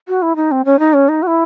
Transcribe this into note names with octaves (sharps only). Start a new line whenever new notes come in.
F#4
E4
D#4
C4
C#4
D#4
C#4
D#4
F#4
E4